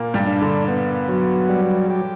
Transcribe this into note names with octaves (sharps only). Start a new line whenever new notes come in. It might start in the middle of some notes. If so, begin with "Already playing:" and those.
Already playing: A#2 A#3
G2 G3
D4
D3
B3
F#3
G3
G4